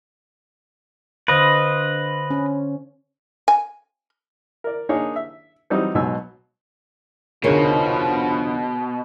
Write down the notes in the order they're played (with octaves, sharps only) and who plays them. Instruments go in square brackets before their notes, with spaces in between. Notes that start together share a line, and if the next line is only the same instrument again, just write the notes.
[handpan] D3 C5 F5 [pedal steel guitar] B4 D#5
[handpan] C#4
[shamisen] G#5
[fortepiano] A#4 D5
A#3 D4 D#4 G#4 A#4 C#5
E5
E3 F#3 G3 C4 D#4
B1 G#2 B2 F#3 G#5 E6
[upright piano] F1 D2 [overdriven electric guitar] B2 [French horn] F3 [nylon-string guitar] G#4 A#4 C#5